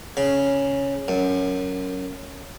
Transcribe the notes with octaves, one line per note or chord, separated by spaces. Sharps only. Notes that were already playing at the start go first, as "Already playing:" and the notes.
C#3
F#2